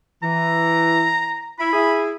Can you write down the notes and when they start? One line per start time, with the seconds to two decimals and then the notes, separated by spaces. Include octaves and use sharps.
0.23 E3 A#5
1.59 E4 B5
1.73 E4 G#4